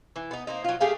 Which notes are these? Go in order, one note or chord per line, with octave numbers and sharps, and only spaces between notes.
E3
B3 D#4
A#3 C4 D#4
F#3 F4
A3 G4 G#4 F5